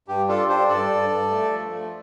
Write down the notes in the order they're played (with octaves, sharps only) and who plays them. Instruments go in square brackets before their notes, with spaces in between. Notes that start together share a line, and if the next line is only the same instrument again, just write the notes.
[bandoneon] G2 G4
D4 F4 A4
D4 G4 C5
G2 A4 D5
G2
G2
A3
F3
A3